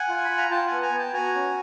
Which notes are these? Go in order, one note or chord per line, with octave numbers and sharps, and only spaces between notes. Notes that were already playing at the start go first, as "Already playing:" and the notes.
Already playing: F#5 G#5
F4
F4 B5
A#5
F4 G5 A5
F#5 G#5
B3
G#5 A#5
B3
G5 A5
F#4 G#5 A#5
C#4